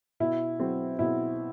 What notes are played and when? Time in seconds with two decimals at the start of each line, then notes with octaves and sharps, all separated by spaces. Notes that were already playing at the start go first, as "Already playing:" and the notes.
0.20 B2 E4
0.60 F#3 C4
0.99 B2 E4